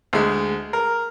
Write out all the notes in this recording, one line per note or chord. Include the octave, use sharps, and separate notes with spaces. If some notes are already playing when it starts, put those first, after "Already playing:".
D2 G#3
A#4